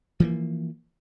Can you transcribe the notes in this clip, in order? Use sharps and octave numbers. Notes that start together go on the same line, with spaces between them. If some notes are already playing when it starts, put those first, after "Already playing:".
E3 F3 A#3